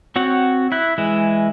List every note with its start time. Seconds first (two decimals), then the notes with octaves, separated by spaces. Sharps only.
0.16 C4 F#4 C#5 F#5
0.72 E4 F#6
0.98 E3 G#3 E4